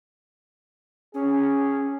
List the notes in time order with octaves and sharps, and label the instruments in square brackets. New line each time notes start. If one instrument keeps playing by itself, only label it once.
[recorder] C#4 [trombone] G#4